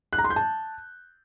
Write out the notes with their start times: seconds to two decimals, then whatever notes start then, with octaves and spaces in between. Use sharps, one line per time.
0.13 F#6
0.18 A#5
0.24 C6
0.30 G6
0.36 A5